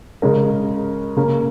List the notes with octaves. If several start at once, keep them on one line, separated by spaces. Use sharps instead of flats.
C#3 G#3 C#4 A#4
C#3 A#3 C#4